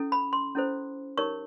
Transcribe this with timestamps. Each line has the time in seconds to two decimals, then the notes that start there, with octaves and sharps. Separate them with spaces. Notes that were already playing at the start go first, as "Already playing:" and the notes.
Already playing: C#4 E4 A4
0.12 B5
0.33 C6
0.55 C#4 E4 A4 C5
1.18 D#4 G4 A#4 C#5 C#6